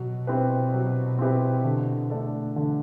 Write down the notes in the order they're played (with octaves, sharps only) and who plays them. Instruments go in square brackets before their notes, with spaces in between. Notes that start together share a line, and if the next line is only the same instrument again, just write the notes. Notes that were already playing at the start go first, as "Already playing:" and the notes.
Already playing: [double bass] B2 [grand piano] F#3
[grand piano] C4 E4 G4 B4
F#3
C4 E4 G4 B4
D3
A3 D4 A4
D3